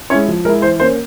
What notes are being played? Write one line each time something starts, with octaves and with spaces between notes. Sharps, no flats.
G#3 C#4 E4 C#5
F3
G#3 E4 A#4
E3 C5
A#3 C#4 C5